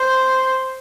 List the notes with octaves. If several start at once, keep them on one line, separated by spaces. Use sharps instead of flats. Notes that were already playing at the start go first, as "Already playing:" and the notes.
Already playing: C5